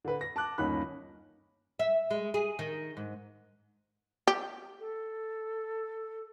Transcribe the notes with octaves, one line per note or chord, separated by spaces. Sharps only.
D3 B4
A#6
A5 D6 F#6
G1 D#2 C#4 D#4 B5 F#6
E5
G#3
G#4
D#3
G#2
G4
A4